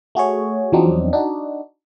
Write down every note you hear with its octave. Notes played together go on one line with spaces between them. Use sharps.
A3 F#4 G#4 C#5
E2 F3 F#3 C4 D4 D#4
D4 D#4 F#4